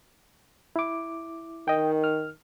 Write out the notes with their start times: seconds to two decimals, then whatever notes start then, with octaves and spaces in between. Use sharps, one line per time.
0.76 E4 D6
1.68 D#3 D#5 G5
2.04 F6